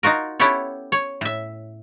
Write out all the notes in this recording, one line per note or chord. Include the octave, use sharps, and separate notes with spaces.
D#4 F4 F#4 A#4
B3 C#4 E4 G4 A4 C#5
C#5
A2 E5